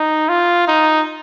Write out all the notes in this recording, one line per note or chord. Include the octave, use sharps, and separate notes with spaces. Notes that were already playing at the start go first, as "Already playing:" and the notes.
Already playing: D#4
F4
D#4